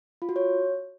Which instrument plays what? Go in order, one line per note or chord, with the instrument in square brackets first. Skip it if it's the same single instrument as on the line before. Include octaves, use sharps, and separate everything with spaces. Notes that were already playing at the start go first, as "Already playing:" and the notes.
[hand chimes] F4
F#4
C#5